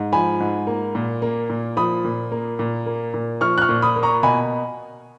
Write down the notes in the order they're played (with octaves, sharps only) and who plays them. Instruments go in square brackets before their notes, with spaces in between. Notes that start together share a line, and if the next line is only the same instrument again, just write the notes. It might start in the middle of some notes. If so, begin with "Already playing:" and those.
Already playing: [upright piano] G#2
F3 G#5 B5
G#2
A#3
A#2
A#3
A#2
F3 B5 D#6
A#2
A#3
A#2
A#3
A#2
F3 C#6 F6
F#6
C#6 F6
A#2
B5 D#6
A#3
A#5 C#6
B2 G#5 B5